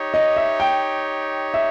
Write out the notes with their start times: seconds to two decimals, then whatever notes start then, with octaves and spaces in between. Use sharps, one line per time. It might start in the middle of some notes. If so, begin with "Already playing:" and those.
Already playing: D#4 G4 C#5
0.14 D#5
0.37 E5
0.60 G5
1.54 E5